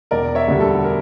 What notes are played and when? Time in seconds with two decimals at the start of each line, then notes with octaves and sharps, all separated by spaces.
0.11 E1 A#4 D5
0.35 C#5 E5
0.48 D2 D3 G3
0.60 A4
0.84 A#4